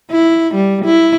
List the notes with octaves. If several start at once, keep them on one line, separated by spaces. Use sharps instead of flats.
E4
G3
E4